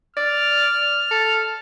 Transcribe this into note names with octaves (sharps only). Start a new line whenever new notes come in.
D5 F6
A4